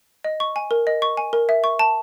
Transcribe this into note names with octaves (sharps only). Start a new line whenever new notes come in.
D#5
C#6
G#5
A#4
D#5
C#6
G#5
A#4
E5
C#6
A5